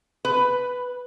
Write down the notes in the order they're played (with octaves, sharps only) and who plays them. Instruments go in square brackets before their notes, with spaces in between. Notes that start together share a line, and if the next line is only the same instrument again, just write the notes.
[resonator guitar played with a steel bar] B4